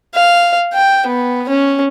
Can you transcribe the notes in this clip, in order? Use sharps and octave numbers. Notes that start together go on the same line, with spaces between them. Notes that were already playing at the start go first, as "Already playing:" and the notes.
F5
G5
B3
C#4